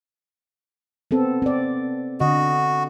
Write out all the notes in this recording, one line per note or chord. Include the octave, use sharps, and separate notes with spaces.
B3 C4 A4
C4 D5
D3 F#4 D#5